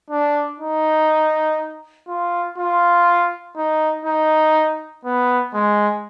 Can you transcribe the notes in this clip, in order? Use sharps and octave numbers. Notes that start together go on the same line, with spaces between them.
D4
D#4
F4
F4
D#4
D#4
B3
G#3